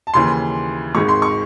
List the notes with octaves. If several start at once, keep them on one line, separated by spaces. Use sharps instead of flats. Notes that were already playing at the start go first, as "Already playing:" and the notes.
A5
D#2 C#3 E3 C6
G#1 G#2 D#3 G#3 C#6
C6
C#6